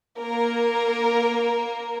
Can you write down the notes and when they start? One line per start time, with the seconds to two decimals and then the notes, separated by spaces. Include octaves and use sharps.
0.20 A#3 A#4